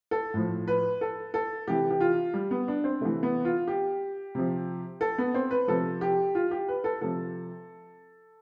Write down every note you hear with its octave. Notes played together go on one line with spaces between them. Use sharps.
A4
A2 F3
B4
A4
A4
C3 E3 G4
G4
F4
G3
B3
D4
C4
C3 E3 A3
B3
F4
G4
C3 F3
A4
B3
C4
B4
C3 F3 A4
G4
F4
G4
B4
A4
C3 F3 A4